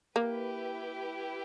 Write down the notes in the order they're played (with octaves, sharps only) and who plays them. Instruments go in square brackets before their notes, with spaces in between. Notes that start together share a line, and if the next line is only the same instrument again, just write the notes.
[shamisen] A#3 [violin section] E4 G4 B4